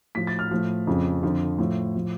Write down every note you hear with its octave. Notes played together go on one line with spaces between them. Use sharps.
A2 F3 B6
A6
F6
A2 F3
F2 C#3 F3
F2 D3 F3
A2 F3
A2 F3